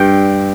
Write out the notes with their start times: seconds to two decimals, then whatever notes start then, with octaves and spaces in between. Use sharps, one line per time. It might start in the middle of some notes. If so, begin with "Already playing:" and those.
Already playing: G2 G5